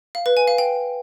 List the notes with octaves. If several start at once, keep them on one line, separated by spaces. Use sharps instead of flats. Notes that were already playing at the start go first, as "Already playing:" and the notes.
F5
B4
G#5
F5
G5